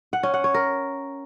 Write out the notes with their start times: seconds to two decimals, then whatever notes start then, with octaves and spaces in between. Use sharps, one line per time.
0.13 F#5
0.23 C#4
0.34 F#5
0.44 C#5
0.54 A#4